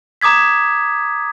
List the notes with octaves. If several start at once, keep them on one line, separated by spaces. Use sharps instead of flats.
A#5 D6 D#6 G#6 B6